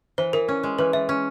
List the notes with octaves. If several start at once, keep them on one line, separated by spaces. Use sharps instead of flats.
E3 C5
E3 A#4
C#4
G#3
E3 B4
E3 E5
C#4